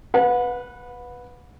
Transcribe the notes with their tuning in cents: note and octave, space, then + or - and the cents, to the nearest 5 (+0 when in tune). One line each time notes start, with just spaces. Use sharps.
B4 +0 F#5 -35